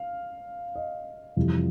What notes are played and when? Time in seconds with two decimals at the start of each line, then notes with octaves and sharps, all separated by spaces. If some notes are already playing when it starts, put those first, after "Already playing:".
Already playing: F5
0.76 D#5
1.37 F2 C3 E3 G3